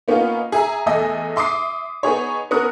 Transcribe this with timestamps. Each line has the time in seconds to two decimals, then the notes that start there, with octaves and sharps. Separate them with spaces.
0.08 A#3 B3 C#4 D#4 F4
0.52 G#4 E5 A#5
0.86 E2 A3 A4 D#5 E5 G#5
1.36 E5 C6 D6 D#6 C7
2.03 B3 D#4 G#4 C#5
2.51 B3 C#4 A#4 D#6 F#6 C#7